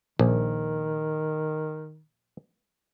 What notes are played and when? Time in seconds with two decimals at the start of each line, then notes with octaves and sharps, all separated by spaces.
0.19 A#1 D#3